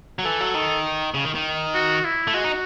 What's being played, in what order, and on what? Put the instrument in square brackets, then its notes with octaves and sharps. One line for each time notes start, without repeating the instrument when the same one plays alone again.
[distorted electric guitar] F#3
[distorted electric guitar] E3 [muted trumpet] A4
[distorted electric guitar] F#3
D#3
C#3
D#3
D#3
[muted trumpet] F#4
E4
[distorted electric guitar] A3
[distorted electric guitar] G#3 [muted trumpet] F#4
[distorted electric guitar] D#4